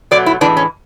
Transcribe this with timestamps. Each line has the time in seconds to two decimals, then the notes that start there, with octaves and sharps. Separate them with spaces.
0.11 B2 F#3 A3 D5
0.26 E4
0.41 A2 E3 G#3 D4
0.57 C#4